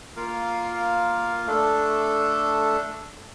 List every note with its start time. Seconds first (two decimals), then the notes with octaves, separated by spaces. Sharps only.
0.16 A#3 F4 A#4 F5
1.46 A3 D4 A4